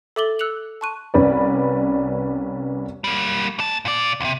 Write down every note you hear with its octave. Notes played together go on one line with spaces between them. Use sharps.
A4 E5 D6 A6 F#7 G7
E6 F#6 C#7 F7 F#7
A5 C6 C#6 F#6 D#7
C2 C#4 B4 D5
G3 A#3
A#3 A5
A#2 D5
C#2 C3